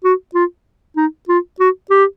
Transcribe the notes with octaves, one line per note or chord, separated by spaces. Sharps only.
F#4
F4
D#4
F4
F#4
G4